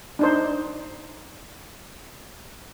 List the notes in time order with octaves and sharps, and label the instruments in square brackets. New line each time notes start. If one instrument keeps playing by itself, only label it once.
[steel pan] D4 D#4 C5